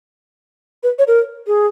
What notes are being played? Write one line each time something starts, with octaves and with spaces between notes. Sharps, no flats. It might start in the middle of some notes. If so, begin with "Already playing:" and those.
B4
C#5
A#4
G#4